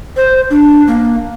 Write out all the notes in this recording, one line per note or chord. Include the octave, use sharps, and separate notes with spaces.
C5
D4
A#3